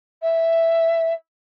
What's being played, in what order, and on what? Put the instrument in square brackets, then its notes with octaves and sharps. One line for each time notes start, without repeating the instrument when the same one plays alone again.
[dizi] E5